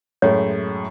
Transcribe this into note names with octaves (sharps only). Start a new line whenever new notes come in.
F#2 A2 G#3 C#5